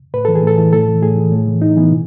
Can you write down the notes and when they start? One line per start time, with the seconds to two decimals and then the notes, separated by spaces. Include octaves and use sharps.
0.14 A2 B4
0.25 E3 A4
0.35 G#4
0.43 A2 A4
0.58 E3
0.73 A2 A4
0.88 E3
1.03 A2 G#4
1.17 E3
1.32 A2
1.48 E3
1.62 A2 D#4
1.77 E3 B3
1.92 B2